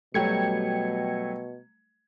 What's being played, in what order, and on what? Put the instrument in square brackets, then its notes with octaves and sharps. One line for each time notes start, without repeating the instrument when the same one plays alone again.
[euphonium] B2 [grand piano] F#3 A3 [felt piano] G3 [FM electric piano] G5 G#6 C#7